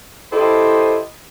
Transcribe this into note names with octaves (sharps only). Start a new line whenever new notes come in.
E4 G4 A4 C5 D#5